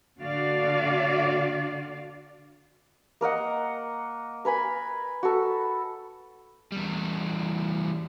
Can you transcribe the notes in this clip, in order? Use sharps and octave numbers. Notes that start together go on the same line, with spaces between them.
D3 F#4 D5 F5
A#3 A#4 D#5 F#5
A#4 B4 G#5 B5
F#4 A4
E2 G3